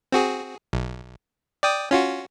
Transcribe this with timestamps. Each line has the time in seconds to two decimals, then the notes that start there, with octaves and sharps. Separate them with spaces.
0.12 C4 F#4 G#4
0.73 B1
1.63 D5 G5 D#6
1.91 C#4 F4 F#4